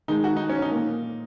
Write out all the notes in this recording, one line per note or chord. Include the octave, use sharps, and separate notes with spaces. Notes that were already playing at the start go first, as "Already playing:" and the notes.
D#3 G#3 D#4
F#4
D#4
C#4
D#4
A#2 A#3